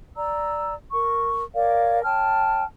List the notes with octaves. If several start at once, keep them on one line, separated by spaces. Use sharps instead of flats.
D5 A#5 E6
A#4 C#6
A#4 C#5 D5 F5
C#5 G5 A5 F6